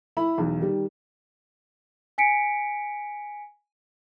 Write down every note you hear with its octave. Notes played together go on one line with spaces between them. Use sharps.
E4 B5
B1 E2
D#3 G3
G#5 B6 C#7 D7